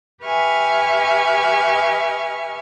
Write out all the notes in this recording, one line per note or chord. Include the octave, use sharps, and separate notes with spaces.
G4 B4 E5 G#5 C#6 F6